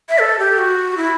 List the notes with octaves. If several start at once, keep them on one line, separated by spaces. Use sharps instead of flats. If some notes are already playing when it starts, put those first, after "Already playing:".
E5
A4
G4
F#4
E4